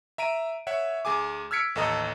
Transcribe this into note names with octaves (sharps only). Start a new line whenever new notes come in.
E5 A#5 D7 D#7
C#5 E5 F#5
D2 G#4 G#5 D6
E6 F6 G#6 B6 C#7 D7
A1 D#2 A4 D#5 A#5 D#6